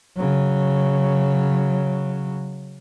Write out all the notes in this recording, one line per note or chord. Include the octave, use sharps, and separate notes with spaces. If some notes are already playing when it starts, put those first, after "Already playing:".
C#3 F#3